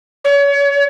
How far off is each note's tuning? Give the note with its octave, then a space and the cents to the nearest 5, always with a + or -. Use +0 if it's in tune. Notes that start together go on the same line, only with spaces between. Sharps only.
C#5 +30